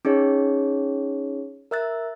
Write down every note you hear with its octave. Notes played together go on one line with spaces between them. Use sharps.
C#4 D#4 G#4 C#5
A#4 E5 E6 F#6 A6